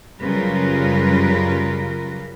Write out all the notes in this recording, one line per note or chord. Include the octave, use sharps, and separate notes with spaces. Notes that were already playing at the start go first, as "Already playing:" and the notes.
F#2 C#3 G3 F4 A#4 B4